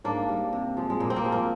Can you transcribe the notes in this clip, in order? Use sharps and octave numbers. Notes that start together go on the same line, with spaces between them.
G#2 A#3 D4
G3
C3
F3 G#3
G#3
A#2 A#3
C4
A#3
F3 G#3
A#3